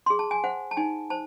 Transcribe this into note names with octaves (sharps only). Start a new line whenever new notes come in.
G#4 C6
A5
G#5
C5 F#5
A5
D#4 G#5
C5 A5